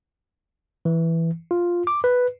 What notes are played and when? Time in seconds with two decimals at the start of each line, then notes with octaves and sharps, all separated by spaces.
0.85 E3
1.51 F4
1.87 D6
2.04 B4